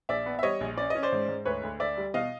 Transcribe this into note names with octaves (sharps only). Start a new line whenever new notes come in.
A#1 D5 E5
B3
E5
G3 C#5 D#5
A#1
C#4 D5
C#4 D#5
C5 D5
G#2
G#2
D2 B4 C#5
D2
D2 D5 E5
G3
B2 D#5 F5